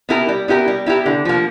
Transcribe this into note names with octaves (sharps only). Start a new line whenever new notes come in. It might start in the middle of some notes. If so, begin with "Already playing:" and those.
B3 E4 G4 A#4
G3
B3 E4 G4 A#4
G3
B3 E4 G4 A#4
D3
F3 A#3